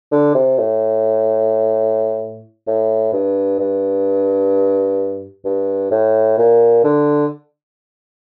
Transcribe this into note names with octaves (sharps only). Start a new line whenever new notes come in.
D3
C3
A2
A2
G2
G2
G2
A2
A#2
D3